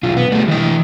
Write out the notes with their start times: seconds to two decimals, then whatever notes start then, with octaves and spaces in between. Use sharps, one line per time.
0.03 B1 F4
0.17 B3
0.32 G3 A3
0.48 E3 D#5